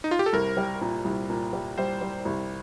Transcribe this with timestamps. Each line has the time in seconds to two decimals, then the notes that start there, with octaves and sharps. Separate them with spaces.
0.04 D#4
0.11 F4
0.19 G4
0.26 A4
0.33 C2 A#4
0.57 G3
0.81 A#2
1.05 C2
1.30 A#2
1.53 G3
1.78 G3 C5
2.01 G3
2.25 C2